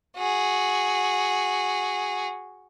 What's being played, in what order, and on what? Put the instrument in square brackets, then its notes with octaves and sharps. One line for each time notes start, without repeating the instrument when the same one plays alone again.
[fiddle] F#4 G#4